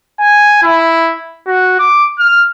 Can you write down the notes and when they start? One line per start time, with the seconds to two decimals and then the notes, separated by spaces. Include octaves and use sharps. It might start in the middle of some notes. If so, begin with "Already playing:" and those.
0.20 G#5
0.63 E4
1.47 F#4
1.79 D6
2.19 F6